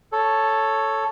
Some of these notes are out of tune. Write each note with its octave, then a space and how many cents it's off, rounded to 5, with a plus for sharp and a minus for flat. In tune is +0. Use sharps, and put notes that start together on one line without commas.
A4 +0 C#5 +0